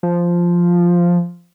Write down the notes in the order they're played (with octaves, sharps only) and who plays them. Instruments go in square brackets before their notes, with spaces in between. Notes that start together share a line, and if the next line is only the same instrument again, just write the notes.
[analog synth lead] F3